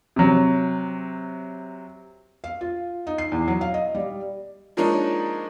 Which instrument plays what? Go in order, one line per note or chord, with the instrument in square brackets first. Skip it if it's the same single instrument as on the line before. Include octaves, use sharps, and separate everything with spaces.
[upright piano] C3 F#3
[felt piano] F5
F4
D#4
C7
E2
F#3
F5
D#5
G3
[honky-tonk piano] F3 G#3 A#3 D4 D#4 C#5